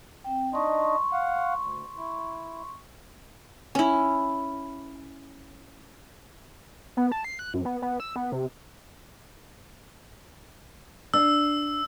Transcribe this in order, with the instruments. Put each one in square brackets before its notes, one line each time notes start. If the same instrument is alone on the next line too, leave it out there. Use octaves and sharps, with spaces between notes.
[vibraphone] C4 G5
[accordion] D4 D#4 D#5 [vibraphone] C6 C#6
[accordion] F5 F#5
D2
E4
[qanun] C#4 E4
[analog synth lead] B3
A5
C7
F#6
F#2
B3
B3
E6
B3
C3
[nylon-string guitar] D4 [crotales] E6